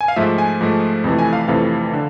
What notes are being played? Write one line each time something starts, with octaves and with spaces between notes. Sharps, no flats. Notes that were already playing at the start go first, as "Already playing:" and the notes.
G#5
F5
G#2 F3 A3 E5
G#5
G#2 F3 A3
F2 C3 E3 A3
G#5
F5
F2 C3 E3 A3 F5
D3